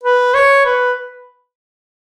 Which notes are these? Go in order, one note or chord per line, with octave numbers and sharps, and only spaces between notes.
B4
C#5
B4